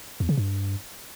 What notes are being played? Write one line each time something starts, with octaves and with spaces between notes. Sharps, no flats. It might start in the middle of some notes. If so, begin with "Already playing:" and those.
E2
C#3
G2